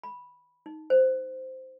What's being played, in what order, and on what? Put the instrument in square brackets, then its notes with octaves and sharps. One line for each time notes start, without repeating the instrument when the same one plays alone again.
[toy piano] B5
D#4
C5